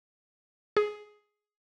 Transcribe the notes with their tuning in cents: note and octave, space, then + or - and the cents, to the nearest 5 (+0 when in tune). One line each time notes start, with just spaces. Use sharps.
G#4 +10